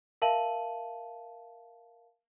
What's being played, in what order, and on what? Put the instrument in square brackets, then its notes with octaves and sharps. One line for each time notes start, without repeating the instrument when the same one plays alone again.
[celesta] A#4 E5 F5 A5 D#7 F#7